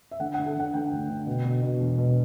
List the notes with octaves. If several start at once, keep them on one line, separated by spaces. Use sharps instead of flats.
E5
D3 F#5
F#5
D3
A4
D3 F#5
D3 G5
D2
D3
B2
B2
B2
E1
B2